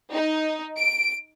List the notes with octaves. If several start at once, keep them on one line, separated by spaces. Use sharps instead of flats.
D#4
D7